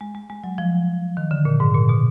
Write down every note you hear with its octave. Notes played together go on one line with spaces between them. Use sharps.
G#3
G#3
G#3
F#3
F3
D#3
D3
A#2
G#2
A#2
B2